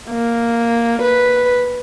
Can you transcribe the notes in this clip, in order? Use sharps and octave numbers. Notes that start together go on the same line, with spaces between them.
A#3
B4